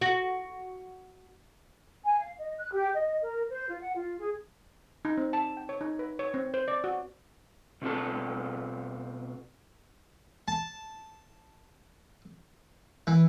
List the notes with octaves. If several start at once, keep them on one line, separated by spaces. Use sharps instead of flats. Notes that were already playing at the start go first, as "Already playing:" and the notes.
F#4
G#5
F5
D#5
F#6
G4
D#5
A#4
C5
F4
F#5
F4
G#4
D#4
C4
A5
G5
C#5
D#4
B4
C#5
C4
C5
D5
F#4
B2 C4 F4 A4 A5
A5
E3